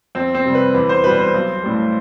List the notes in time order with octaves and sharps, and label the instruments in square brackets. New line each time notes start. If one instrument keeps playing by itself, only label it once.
[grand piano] F2 C4
C4
C3 G3
B4
E2 B4
C5
B2 G3 B4
C5
B1
A2 G3